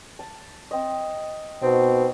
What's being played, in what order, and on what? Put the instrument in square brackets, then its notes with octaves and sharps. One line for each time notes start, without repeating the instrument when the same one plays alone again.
[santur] A5
C4 D#5
[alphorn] B2 [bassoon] C4 [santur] D#4